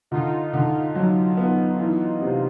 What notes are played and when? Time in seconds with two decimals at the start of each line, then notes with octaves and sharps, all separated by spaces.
0.11 D3 D#4 F4
0.53 D3
0.95 F#3
1.37 B3
1.79 E3
2.21 C3